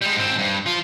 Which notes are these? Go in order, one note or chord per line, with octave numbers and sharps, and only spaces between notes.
G3 G#3
G#2 C4
G2
F3 F4